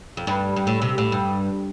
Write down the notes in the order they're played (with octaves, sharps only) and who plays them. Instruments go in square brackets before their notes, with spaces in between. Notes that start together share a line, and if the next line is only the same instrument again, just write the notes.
[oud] F2
G2
G2
A2
C3
A2
G2